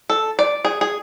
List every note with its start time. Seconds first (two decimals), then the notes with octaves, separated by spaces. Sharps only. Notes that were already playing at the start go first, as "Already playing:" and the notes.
0.10 A4
0.39 D5
0.65 G#4
0.81 G#4